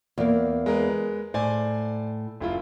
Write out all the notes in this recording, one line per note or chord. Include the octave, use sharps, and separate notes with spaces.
E2 A#3
G#3 A#4 B4
A2 C5 D5 G#5
F#1 E4 F4